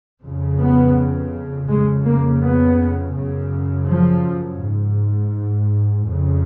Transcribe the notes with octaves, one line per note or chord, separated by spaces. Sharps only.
F2 C#3
B3
F2 C#3 G#3
A#3
B3
F#2 C#3
F3
G#2
F2 C#3